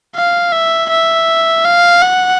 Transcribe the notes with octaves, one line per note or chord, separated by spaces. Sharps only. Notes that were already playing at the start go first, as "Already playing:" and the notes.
F5
E5
E5
F5
F#5